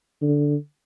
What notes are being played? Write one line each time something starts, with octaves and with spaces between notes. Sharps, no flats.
D3